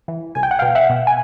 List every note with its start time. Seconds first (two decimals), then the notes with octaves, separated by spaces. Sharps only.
0.08 E3
0.35 C2 G#5
0.43 G5
0.51 F#5
0.59 B2 F5 G5
0.75 E5 F#5
0.89 B2
1.07 G#5